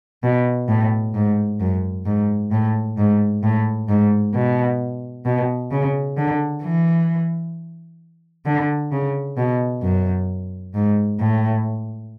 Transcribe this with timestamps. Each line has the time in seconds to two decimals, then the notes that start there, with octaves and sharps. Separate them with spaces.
0.23 B2
0.69 A2
1.15 G#2
1.60 F#2
2.06 G#2
2.52 A2
2.98 G#2
3.43 A2
3.89 G#2
4.35 B2
5.26 B2
5.71 C#3
6.17 D3
6.63 E3
8.46 D3
8.92 C#3
9.37 B2
9.83 F#2
10.74 G#2
11.20 A2